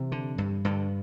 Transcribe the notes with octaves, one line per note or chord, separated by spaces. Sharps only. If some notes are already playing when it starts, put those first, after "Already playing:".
Already playing: C3 E3
D3
G2
G2 D3